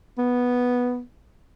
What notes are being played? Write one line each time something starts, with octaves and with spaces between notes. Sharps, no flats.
B3